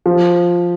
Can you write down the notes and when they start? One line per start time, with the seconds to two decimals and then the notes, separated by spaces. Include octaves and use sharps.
0.06 F3